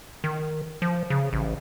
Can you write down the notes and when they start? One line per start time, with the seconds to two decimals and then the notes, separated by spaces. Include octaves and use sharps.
0.24 D#3
0.82 F3
1.10 C#3
1.33 A1